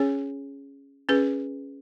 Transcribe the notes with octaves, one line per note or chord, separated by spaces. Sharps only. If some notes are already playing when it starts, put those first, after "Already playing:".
Already playing: C#4 G#4 C#5
C#4 G#4 B4